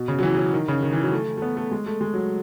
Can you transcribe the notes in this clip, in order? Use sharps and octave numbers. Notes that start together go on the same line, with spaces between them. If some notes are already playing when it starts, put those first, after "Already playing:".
Already playing: B2
C#3
F#3
E3
F#3
D#3
C#3
D#3
E3
F#3
A3
A3
B3
A3
G#3
A3
G#3
F#3